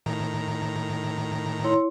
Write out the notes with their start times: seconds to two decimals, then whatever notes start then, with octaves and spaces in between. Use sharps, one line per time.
0.06 A2 D#3 A#5
1.64 E4 C#5 C6